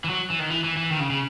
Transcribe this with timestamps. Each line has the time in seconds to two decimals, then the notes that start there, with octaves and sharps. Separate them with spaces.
0.04 E3
0.09 F#3
0.30 E3
0.39 D#3
0.50 E3
0.64 E3
0.77 E3
0.90 D#3
0.99 C#3
1.10 C#3